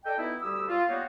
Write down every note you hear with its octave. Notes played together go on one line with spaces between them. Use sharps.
A4 D5 D#5 G5
B2 B3 D#4 E4
D2 G3 G4 D#6 E6
F4
G3 A#3 B3 D#4 F#4 C#5